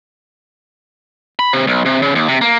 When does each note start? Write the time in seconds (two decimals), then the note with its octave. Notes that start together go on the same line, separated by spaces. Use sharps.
1.39 B5
1.53 C3
1.67 B1
1.86 C3
2.02 C#3
2.15 D#2
2.28 C3
2.41 A#3